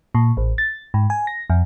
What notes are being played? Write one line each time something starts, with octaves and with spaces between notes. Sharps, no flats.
A#2
A1
A6
G#2
G#5
A#6
F2